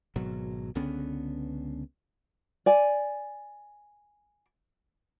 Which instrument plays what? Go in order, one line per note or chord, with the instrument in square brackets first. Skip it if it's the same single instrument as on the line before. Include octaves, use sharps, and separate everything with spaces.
[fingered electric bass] G#1 B2 F#3
C#2 D3 B3 C#4
[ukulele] D5 G#5